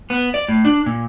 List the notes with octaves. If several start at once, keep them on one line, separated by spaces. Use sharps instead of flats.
B3
D5
A2
D4
A#2